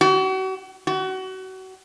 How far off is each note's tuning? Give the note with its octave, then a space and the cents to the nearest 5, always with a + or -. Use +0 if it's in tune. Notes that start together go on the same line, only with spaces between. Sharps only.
F#4 +40
F#4 +30